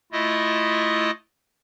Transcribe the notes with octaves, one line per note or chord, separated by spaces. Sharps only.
A3 E4 F4 D#5 D#6